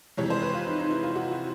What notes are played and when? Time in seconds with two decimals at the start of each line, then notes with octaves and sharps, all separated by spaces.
0.17 F2 C3 E3 G#3 C#5
0.30 C5
0.42 B4
0.54 F4
0.67 D#4
0.79 D#4
0.91 E4
1.03 F4
1.15 F#4
1.31 F#4